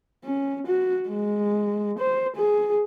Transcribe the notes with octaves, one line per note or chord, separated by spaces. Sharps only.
C#4
F#4
G#3
C5
G#4